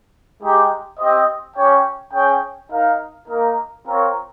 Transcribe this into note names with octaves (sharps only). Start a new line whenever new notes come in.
G#3 D#4 G4
C4 G4 C5 D#5
C#4 G4 C#5 G5
C#4 G#4 C#5 G5
D#4 A#4 F5
A#3 D#4 A#4
C4 F4 A#4 C#5